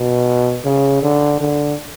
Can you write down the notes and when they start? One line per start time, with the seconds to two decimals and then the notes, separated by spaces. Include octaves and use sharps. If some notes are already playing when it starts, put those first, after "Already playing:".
Already playing: B2
0.64 C#3
1.02 D3
1.40 D3